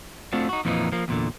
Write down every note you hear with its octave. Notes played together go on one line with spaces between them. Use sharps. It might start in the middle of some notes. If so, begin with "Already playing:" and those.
A3 C4 D4 F4 F#4
D#4 F#4
F2 A#2 E3 F3 A#3 D#4
F3 A#3
E2 A#2 D3